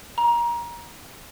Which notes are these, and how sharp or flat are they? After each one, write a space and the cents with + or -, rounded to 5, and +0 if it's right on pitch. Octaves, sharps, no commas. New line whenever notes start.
A#5 +25